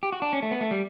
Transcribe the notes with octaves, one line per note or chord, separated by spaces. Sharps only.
G4
F#4
D4
C#4
A3
B3
A3
G3